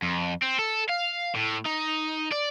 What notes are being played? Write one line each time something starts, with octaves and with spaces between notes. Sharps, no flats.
F2
C4
A4
F5
A2
D#4
D5